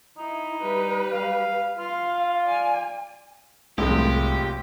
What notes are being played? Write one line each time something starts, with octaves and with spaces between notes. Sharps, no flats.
D#4 E4
G3 B4
F5
F4 F5
D5 G#5
F#1 C2 A2 C3 F3 G#3 G4